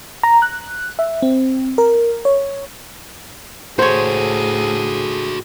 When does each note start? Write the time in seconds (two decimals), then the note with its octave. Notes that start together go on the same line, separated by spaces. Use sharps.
0.23 A#5
0.42 F#6
0.99 E5
1.22 C4
1.78 A#4
2.25 C#5
3.79 A2 F#4 G#4 A4 C5 C#5